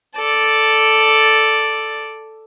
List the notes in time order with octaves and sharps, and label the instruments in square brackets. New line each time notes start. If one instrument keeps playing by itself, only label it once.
[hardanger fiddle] A4 D5